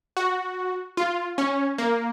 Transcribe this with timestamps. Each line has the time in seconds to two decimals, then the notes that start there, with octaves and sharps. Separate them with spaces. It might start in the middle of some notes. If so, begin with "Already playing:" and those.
0.17 F#4
0.97 F4
1.38 C#4
1.78 A#3